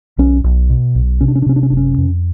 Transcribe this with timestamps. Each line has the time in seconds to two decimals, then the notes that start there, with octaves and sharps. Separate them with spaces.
0.18 B1 C#4
0.44 B1
0.70 B2
0.95 B1
1.21 C3 C#4
1.28 D4
1.35 C#4
1.42 D4
1.46 C3 C#4
1.56 D4
1.63 C#4
1.70 F#1 D4
1.77 C#4
1.98 F2